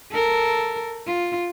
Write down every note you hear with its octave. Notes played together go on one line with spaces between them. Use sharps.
A4 A#4
F4